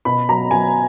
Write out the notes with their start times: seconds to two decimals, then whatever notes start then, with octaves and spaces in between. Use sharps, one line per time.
0.05 B2 B5
0.29 F#3 A#5
0.51 F#3 G#5